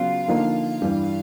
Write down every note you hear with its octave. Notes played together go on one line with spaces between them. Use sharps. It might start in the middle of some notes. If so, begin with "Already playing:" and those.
Already playing: C#3 F#3 B3 F4
D3 F3 A#3 D#4
G2 E3 G3